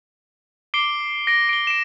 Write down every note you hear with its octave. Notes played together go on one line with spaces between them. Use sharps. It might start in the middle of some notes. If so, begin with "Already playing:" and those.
D6 C7 D7 G7
A#6 D7
D7 G7
D7 E7